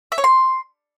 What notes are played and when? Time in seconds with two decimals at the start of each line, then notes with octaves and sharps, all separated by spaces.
0.12 E5
0.18 C#5
0.24 C6